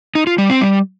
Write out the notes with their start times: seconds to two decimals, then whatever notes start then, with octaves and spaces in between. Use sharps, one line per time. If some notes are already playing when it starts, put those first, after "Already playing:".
0.15 D#4
0.27 F4
0.38 G3
0.50 C4
0.61 G3